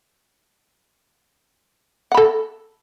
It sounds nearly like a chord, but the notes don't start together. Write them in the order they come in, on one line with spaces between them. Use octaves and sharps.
F#5 B5 A4